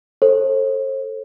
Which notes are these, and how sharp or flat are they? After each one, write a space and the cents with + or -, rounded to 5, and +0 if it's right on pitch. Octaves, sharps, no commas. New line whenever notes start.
A4 +10 C5 +40